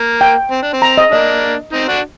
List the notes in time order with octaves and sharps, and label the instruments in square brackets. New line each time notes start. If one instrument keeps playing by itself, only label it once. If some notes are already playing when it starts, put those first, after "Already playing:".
Already playing: [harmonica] A#3
[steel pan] G5
[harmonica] C4
D4
C4
[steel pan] A#5
D#5
[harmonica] A#3 D4 [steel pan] D#5
[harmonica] C4 D#4
D4 F#4